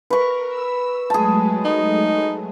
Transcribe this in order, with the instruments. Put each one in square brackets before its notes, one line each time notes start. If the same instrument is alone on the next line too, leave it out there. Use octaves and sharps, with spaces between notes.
[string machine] A#4 [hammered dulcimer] B4 C#6
[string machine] E6
[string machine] F#3 G#3 A3 [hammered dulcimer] G#4 A5
[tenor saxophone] D#4